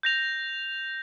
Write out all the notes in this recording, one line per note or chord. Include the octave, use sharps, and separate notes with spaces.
G6 A#6 F7